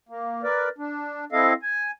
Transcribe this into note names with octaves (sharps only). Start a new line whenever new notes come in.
A#3
A#4 B4 D5
D4
C4 E4 A4 D#5 F5
G#5